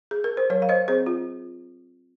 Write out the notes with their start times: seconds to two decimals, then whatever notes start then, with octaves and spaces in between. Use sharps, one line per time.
0.11 G#4
0.24 A#4
0.37 C5
0.50 F#3 A#4 C#5
0.62 F5
0.69 C5 D#5
0.88 C4 G#4 C5
1.06 F4